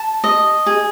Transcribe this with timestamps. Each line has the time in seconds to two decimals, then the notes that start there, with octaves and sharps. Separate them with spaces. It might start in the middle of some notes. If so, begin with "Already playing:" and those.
Already playing: A5
0.24 D#5
0.66 G#4